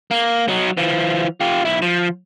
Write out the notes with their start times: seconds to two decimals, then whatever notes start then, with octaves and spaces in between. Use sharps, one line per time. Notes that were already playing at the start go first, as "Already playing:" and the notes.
0.11 A#3
0.48 F#3 D#4
0.77 E3 F3
1.40 F4 G4
1.65 B1 E4
1.82 F3